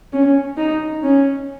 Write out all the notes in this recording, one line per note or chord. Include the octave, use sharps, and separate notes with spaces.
C#4
D#4
C#4